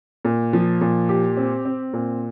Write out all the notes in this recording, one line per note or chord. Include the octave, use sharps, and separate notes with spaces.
A#2
F3
A#2
G4
C4
C4
A#2